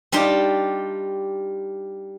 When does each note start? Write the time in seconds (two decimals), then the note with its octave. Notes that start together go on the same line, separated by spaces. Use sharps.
0.12 G3 D4 D#4 F4 G4